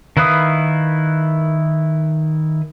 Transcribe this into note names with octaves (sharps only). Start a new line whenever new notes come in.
D#3 E4 B4 F5 D#6